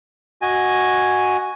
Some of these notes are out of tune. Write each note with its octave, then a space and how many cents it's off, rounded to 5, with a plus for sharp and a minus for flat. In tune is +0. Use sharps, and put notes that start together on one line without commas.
F#4 +0 D#5 +5 G#5 +0